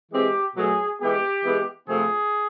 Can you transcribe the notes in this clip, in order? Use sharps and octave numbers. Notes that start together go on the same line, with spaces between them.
E3 G#3 C4 G4
B2 F#3 A3 G#4
E3 G#3 B3 G4
E3 G#3 B3
C3 F3 A3 C4 G#4